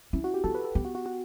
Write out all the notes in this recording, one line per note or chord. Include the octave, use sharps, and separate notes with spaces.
C#4 E4
F#4
G4
B3 A4
B4
A4
B3 G4
F#4
F#4
F#4